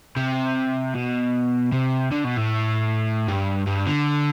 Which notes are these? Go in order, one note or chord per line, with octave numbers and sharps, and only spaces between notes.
C3
B2
C3
D3
B2
A2
G2
G2
D3